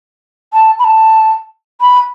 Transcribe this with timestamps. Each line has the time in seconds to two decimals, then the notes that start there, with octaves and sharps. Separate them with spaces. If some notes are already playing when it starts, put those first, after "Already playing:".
0.53 A5
0.79 B5
0.84 A5
1.81 B5